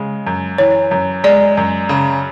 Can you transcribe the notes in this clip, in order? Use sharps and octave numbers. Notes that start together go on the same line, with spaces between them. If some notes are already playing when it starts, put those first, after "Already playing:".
Already playing: C#3 G#3
F#2
E3 C#5
F#2
G#3 D5
F#2
C#3